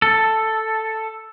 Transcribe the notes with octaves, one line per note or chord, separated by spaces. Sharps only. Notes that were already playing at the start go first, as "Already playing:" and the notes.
A4